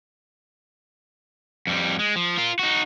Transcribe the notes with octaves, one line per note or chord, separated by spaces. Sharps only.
F2 G3
G#3
F3
F4 A#4
D#4 F#4